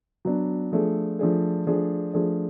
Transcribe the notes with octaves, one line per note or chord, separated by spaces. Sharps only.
F#3 B3 D4
F3 A3 D4 G#4
F3 A3 D4 G#4
F3 A3 D4 G#4
F3 A3 D4 G#4